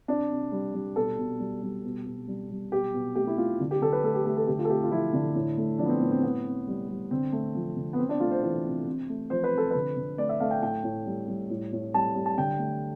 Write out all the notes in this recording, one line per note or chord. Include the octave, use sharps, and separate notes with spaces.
C3 D4
C3
G3
G3
B2 A4
B2
G3
G3
B2
B2
G3
G3
B2 G4
B2
A3 G4
E4
A3 F4
D3
G4
D3 A4
B4
A3 A4
G4
A3 G4
A4
D3 G4
F4
A4
A3 G4
F4
F3 E4
D3
A2
A3
F3 D4
B3
C4
A2 B3
C4
C3 B3
C3
G3
G3
D3 C4
A3
F3
D3
B3
C3 C4
D4
A3 F4
C5
E3 C5
C3
C3
A3
F3 C5
B4
C3
A4
D3 B4
D3
A3 D5
E5
A3 F5
G5
A2 G5
A2
G3
G3
A2
A2
G3 A5
G3
A5
D3 G5
A3